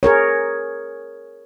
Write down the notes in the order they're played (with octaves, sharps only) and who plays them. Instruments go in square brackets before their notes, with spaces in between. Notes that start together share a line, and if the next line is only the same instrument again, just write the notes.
[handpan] G#4 A#4 C#5